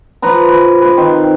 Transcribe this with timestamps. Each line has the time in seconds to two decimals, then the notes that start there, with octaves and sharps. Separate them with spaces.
0.22 F3 B4 A#5 B5
0.48 B4
0.82 B4 F5
0.97 D#3 C4